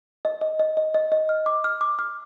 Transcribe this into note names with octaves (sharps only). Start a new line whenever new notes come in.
D#5
D#5
D#5
D#5
D#5
D#5
F6
D6
F6
D6
F6